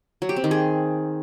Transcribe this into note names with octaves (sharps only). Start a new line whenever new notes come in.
F#3
G4
C4
D#3
G#4